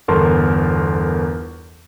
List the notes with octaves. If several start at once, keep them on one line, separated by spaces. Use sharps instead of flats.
G1 E2 A4 A#4 A5 C6